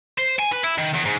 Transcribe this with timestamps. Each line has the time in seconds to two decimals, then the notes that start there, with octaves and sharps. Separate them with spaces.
0.18 C5
0.39 G#5
0.52 B4
0.64 E4
0.78 D#3
0.94 E2
1.05 G#2